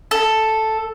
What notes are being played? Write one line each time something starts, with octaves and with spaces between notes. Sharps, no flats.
A4